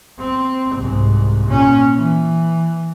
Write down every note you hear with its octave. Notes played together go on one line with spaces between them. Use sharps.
C4
C2 G#2
A#2 C#4
E3